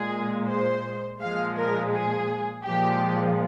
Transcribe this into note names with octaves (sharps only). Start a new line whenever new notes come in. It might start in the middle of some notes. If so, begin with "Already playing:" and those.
Already playing: A#2 G#3 G#4
C5
A#2 F3 G#3 F5
A#4
G#4
A#2 F3 G#3 G4